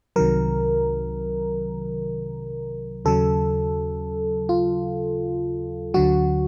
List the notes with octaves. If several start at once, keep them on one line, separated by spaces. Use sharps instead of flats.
C2 C3 D#3 F#3 A#4
D#2 C#3 F#3 A4
F4
D2 D3 F#3 F#4